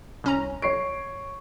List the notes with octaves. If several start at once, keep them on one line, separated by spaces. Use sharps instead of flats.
C2 C#4 A#5
C#5 C#6 C7 D7